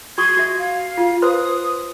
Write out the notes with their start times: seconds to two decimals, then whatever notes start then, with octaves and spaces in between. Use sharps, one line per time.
0.18 F#4 C#6 D#6 G#6
0.37 F#4 E5
0.59 F5
0.98 F4
1.22 B4 C5 C6 D#6